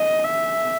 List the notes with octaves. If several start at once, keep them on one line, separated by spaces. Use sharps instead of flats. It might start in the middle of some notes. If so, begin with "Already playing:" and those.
Already playing: D#5
E5